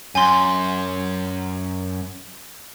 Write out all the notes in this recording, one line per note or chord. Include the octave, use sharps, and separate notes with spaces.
F#2 G#5 C6